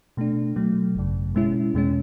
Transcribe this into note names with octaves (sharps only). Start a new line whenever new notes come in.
B2 A3 D4
B2 F#3 A3
G#1 F#2 C#3
B2 G#3 C#4 E4
E2 B2 G#3 C#4